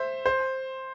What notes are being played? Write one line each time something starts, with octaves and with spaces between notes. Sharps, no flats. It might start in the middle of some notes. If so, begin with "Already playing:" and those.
Already playing: C5 E5
C5